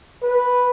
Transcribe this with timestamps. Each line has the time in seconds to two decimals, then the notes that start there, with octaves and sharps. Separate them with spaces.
0.23 B4